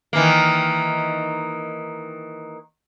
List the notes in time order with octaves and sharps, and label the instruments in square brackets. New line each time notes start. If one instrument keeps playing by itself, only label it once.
[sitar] D#3 E3 A#3